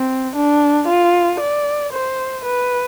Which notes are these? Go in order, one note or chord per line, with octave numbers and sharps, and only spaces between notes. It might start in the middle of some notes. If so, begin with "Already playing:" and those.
Already playing: C4
D4
F4
D5
C5
B4